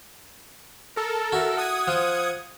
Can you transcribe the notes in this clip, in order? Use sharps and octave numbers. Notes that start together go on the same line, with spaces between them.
A4 A#4
E4 F#4
F#5 D#6 G#6
F3 F4